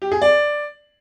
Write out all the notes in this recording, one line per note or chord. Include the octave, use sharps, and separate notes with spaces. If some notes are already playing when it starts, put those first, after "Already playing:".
G4
G#4
D5